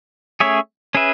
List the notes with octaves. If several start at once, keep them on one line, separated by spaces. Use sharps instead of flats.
A3 C#4 G#4 C#5 E5
C#4 G#4 B4 E5